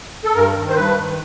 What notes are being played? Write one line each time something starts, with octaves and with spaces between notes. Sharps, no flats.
A4
G2 A#4
D#3
C5
G2 B4
D#3